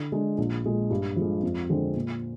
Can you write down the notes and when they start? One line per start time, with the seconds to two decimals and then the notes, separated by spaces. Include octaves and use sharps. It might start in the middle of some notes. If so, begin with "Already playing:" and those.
Already playing: D3
0.12 G#3 D4
0.38 A#1
0.64 A#2 G#3
0.91 G2
1.16 F3 G#3
1.43 F2
1.70 D3 F3 G#3 C4
1.95 A#2